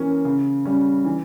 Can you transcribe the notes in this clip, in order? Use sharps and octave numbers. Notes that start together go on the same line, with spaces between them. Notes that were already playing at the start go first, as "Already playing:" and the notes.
Already playing: E3 A#3 C#4
C#3
G3 C#4
E3